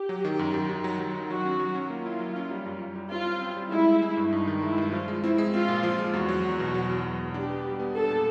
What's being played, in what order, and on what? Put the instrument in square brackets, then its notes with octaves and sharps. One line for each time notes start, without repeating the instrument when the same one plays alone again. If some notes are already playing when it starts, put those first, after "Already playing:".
Already playing: [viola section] G4
[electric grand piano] F#3
D#3
F#2
F#2
D#3
F#3
F#3
D#3
[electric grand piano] F#3 [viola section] F#4
[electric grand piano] C#4
F#3
C#4
[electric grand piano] A#3 [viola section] F4
[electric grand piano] E4
F#3
C#4
G3
F#2
F#2
G3
[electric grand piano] C4 [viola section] F4
[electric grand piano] C4
C4
G3
[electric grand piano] G#3 [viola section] E4
[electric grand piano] G#3
G#3
G2
[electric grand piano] G2 [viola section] D#4
[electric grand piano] D#3
[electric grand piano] G#3 [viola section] E4
[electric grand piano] G2
[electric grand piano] F3 [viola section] F4
[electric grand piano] G#3
[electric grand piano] C4 [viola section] E4
[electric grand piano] G#3
[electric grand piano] C4 [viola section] F4
[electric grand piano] A#2
F3
G#3
[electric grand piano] E2 [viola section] F#4
[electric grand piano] F#3
E2
B2
F#3
E2
F#3
B2
[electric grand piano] D4 [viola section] G4
[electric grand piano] B3
G3
B3
[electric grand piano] D4 [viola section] A4
[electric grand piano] A#2